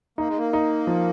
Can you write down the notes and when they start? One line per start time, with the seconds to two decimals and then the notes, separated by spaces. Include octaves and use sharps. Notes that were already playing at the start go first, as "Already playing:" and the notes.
0.18 A#3 D#4
0.28 G#3
0.38 A#3
0.53 D#4
0.87 F3